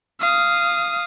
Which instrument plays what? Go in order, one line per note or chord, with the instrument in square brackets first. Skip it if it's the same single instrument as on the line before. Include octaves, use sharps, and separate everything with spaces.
[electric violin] F5 D#6